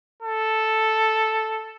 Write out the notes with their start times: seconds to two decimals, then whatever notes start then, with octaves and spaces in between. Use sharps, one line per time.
0.23 A4